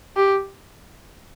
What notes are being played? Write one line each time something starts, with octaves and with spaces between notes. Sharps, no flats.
G4